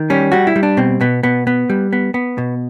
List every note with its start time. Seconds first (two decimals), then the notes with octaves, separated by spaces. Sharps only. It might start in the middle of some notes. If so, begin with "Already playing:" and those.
Already playing: D#3
0.10 G3 C#4
0.32 G3 F#4
0.47 E4
0.56 G3
0.63 D4
0.77 B2 C4
1.01 B2 B3
1.23 B2 B3
1.47 B3
1.70 G3
1.93 B3
2.14 B3
2.38 B2